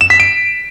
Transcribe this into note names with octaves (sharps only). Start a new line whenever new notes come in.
E7
B6
D7